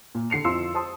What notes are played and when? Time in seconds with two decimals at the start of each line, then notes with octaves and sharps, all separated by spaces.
0.15 A#2
0.30 D3 C7 C#7 F7
0.44 F2 E4 F4 C6 E6
0.74 C5 A5 C6 D#6